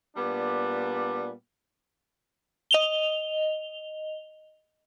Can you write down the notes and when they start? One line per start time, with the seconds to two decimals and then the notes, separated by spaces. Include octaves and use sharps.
0.16 A#2 G3 B3 D4
2.71 D#5 F7 G7